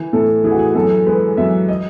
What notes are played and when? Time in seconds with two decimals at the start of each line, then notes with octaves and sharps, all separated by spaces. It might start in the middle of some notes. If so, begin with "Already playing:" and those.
Already playing: E3
0.13 A2 A4
0.44 E3 G#4
0.52 F#4
0.59 G#4
0.75 F#2 A4
1.06 G#3 B4
1.37 F#2 E5
1.69 D#5